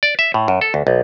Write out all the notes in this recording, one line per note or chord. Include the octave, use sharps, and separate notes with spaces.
D5
E5
A2
F#2
A4
D2
B1